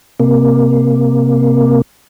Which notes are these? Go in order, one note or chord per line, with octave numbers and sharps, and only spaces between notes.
C3 A#3